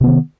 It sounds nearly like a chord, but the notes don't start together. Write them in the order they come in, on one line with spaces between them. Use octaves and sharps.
C3 B3 D#3